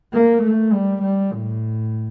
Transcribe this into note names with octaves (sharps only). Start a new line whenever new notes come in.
A#3
A3
G3
G3
A2